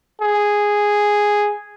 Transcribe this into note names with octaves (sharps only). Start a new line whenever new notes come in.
G#4